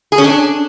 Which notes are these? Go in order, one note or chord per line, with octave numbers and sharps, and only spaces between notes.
G#4
C#4
D4